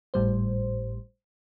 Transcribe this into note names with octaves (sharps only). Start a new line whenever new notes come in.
G#1 A2 G3 C5